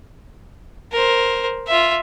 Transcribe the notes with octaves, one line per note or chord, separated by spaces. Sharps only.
A#4 C5
F4 E5